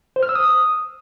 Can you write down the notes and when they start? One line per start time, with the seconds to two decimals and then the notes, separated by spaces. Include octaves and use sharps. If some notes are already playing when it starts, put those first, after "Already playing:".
0.16 C5
0.23 F6
0.29 E6
0.35 D#6